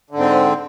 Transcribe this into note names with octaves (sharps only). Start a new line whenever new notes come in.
G#2 D3 C4